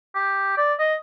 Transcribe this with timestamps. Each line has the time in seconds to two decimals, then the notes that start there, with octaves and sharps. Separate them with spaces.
0.15 G4
0.57 D5
0.79 D#5